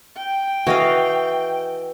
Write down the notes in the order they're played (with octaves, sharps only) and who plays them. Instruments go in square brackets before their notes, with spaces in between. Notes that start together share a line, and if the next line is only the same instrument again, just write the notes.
[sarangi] G5
[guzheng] E3 D#5 F5 [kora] F#4